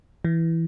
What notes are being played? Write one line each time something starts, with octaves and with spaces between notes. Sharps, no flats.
E3